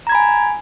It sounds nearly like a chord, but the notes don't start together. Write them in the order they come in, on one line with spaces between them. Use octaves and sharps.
A#5 G#6 B5 G#5